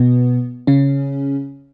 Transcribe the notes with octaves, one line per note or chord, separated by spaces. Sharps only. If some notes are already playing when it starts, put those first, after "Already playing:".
Already playing: B2 B3
C#3 C#4